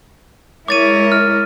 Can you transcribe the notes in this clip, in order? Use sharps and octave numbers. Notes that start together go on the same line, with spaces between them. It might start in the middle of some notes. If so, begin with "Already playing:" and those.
G#3 E4 A#4 C#5 D6 A6 D#7
F6